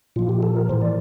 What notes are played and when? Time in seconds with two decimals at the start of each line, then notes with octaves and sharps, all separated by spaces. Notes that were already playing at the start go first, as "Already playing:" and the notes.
0.16 A#2 F3 F4
0.29 G4
0.43 A4
0.56 A#4
0.69 A2 E3 C5
0.81 D5